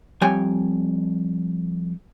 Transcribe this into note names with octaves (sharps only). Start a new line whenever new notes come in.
F2 G3 C#5 G5 G#5